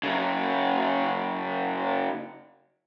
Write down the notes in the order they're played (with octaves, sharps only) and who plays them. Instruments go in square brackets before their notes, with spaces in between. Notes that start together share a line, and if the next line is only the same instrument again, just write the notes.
[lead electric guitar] F#2 C#3